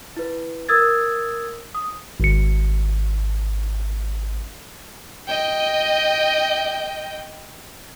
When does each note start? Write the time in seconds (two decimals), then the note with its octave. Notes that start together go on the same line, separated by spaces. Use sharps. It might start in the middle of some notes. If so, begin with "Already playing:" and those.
0.17 E4 B4
0.69 A#4 D#6 E6 G#6 A6
1.75 D#6
2.20 G#1 C#7
5.27 D#5 G5